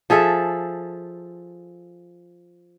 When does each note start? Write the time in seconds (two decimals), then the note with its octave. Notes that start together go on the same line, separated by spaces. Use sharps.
0.10 F3 G#4 A4 E5